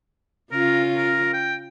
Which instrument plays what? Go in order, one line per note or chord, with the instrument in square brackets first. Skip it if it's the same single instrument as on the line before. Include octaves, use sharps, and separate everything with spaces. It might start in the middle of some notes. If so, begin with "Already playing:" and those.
[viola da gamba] C#3 C#4 F4 [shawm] A#4
[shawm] A#4
G5